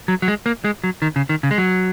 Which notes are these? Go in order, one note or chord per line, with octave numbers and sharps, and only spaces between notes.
F#3
F#3
G#3
A#3
G#3
F#3
D#3
C#3
D#3
C#3
G#3
F#3